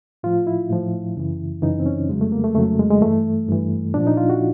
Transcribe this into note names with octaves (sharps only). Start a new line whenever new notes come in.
A2 F3 F4
E4
A2 F3
F#2 C#3 E3
F#2 C#3 E3 D#4
C4
C#4
F2 C#3 F#3 G#3
A3
A#3
A3
F2 C#3 F#3 A3
G#3
G#3
G2 E3 A3
G2 E3
A#2 F3 D4
D#4
F4
F#4